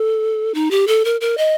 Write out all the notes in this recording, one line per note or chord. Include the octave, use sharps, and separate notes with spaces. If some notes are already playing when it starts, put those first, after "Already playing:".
Already playing: A4
D#4
G4
A4
A#4
A#4
D#5